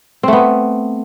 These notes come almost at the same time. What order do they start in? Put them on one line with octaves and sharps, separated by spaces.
C4 A3 B3